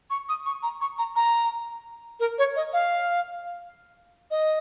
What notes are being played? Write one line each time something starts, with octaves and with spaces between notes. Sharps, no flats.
C#6
D#6
C#6
A#5
C#6
A#5
A#5
A#4
C#5
D#5
F5
D#5